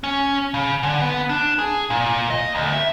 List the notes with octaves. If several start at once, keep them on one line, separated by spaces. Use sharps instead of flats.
C#4
C#3
D3
B3
D4
G#4
A#2
D#5
D2
E5